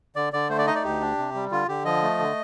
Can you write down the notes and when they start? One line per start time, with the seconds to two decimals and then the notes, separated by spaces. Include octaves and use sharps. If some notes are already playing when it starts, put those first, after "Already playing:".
0.16 D3 D5
0.33 D3 D5
0.50 A3 C5
0.58 D5
0.67 D#4 D#5
0.75 D5
0.84 D2 G4
1.01 D4
1.18 C3
1.35 G3
1.51 D3 F4
1.68 D3 G4
1.85 F3 D#5
2.02 A3
2.19 D3